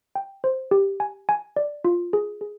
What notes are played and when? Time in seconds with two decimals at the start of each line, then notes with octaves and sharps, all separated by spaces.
0.15 G5
0.44 C5
0.71 G4
1.00 G#5
1.29 G#5
1.56 D5
1.85 F4
2.13 G#4
2.41 G#4